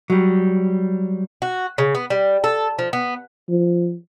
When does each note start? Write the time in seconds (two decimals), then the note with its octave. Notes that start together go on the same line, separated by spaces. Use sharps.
0.10 F#3 G3
1.42 F#4
1.78 C#3
1.95 B3
2.10 G3
2.44 A4
2.79 F3
2.93 B3
3.49 F3